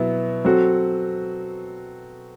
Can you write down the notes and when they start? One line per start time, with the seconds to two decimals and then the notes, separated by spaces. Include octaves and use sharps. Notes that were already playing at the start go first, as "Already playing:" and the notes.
Already playing: B2 F#3 B3 E4
0.45 F#3 C4 F#4 A4